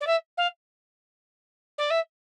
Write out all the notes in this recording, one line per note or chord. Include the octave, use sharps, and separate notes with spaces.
D5
E5
F5
D5
E5